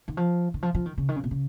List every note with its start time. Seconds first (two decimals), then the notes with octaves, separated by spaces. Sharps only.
0.08 D#3
0.17 F3
0.54 D#3
0.63 F3
0.75 F3
0.85 D#3
0.98 C#3
1.09 D#3
1.16 C#3
1.24 B2
1.31 C#3